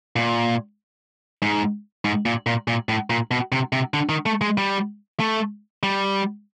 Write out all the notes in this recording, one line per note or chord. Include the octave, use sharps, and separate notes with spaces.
A#2
G#2
G#2
A#2
A#2
A#2
A2
A#2
B2
C3
C3
D3
D#3
A3
G#3
G3
A3
G3